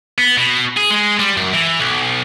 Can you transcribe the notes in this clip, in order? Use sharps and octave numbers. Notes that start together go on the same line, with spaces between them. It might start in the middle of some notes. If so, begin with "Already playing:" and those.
B3
B2
G#4
G#3
G3
F#2
E3
B1